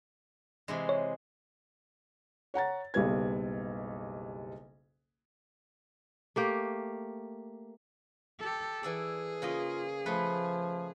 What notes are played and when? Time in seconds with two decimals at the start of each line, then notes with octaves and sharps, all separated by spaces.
0.68 C3 E3 G#3
0.89 C#5
2.54 C#5 F#5 A#5 A6
2.94 F#1 B1 G3 B4 G#6
6.36 A3 A#3 G4
8.40 G4 A4
8.83 E3 G#4 A4 D5
9.42 C#3 A#3 F4 D#5
10.06 F3 A3 B4